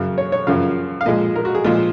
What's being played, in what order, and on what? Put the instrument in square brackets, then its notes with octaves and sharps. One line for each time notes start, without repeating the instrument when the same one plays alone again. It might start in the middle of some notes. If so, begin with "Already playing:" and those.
Already playing: [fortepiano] F#2 C#3 F#3
C#5
C#5
F#2 C#3 F3 F5
F5
A#2 F3 G#3 D#5
A#4
F#4
G#4
A#2 F3 G#3 F4